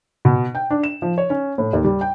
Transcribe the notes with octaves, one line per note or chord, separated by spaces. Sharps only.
B2
G5
D4
E7
F3
C#5
C#4
A2
D#2
G3
G5